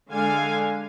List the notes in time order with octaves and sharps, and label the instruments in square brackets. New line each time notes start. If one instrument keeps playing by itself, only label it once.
[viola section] D3 G#3 D4 F5 G#5